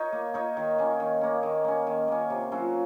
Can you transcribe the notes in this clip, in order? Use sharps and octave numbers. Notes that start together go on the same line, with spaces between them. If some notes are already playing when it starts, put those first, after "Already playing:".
Already playing: D#4 A#4 C#5
A#3
D#4 A#4 C#5
D#3
A#3 C#4
D#3
A#3 C#4
D#3
A#3 C#4
D#3
A#3 C#4
C3
F#3 C#4 F4